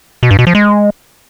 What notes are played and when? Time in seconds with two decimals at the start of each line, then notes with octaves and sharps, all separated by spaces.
0.23 B2
0.31 G2
0.39 B2
0.47 F3
0.55 G#3